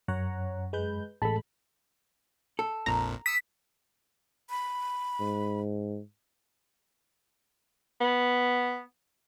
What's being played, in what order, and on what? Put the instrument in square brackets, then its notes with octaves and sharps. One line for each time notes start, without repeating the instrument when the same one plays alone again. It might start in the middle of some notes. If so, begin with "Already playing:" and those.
[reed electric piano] F#2 [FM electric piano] C#5 F#5 A#5
[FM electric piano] G#3 B4 G6
[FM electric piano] A1 G#3 B5 [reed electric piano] A4 A5
[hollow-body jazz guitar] A4
[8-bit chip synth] A#1 F2 A#2 [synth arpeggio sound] A#5
[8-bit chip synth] D#6 E6 C#7 [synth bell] B6
[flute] B5
[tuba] G#2
[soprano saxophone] B3